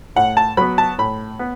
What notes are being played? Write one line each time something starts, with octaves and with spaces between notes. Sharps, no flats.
A2 F#5
A5
F#3 B3 B5
A5
A2 B5
B3